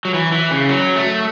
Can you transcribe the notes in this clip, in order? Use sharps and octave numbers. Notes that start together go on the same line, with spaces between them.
F#3
E3
E3
C#3
F#3
A3